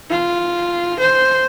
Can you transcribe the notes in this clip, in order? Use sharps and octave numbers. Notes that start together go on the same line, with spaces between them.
F4
C5